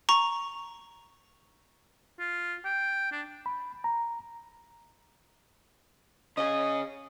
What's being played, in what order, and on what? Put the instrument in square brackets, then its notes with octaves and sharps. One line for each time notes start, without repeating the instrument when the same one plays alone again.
[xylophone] A#5 C#6
[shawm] F4
G5
D4
[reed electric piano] B5
A#5
[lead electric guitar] C#3 G#4 [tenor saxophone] D#5